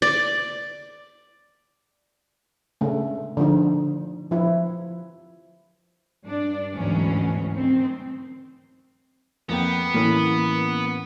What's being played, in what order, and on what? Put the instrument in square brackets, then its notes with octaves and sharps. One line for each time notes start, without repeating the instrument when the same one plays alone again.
[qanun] D5
[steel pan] C#3 A3
D3 F3 D#4
F3 E4
[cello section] G2 D4 D5
D2 G#2 B2 E3 F#3 C#4
D#3 C4
[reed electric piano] F2 A#3 G5 [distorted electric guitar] B3
[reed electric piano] A2 C#4 [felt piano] E3 A#3